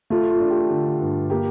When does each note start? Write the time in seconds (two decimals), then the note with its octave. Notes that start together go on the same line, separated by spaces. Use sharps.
0.10 A3 F4 A4
0.30 F4
0.40 D4
0.50 G4
0.70 D3
1.01 G2
1.30 A#3 G4